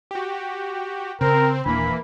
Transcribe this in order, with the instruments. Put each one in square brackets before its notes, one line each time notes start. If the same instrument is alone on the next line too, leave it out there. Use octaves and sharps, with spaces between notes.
[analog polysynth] F#4 G4
[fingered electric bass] C#3 [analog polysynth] C4 [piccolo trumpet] A#4
[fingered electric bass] D#1 D4 [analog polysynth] E3 A#3 [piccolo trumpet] B5